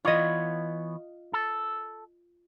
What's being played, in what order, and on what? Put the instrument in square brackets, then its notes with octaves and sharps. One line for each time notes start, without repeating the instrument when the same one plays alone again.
[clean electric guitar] E3 B3 C#5 [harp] F4 D#5
[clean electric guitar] A4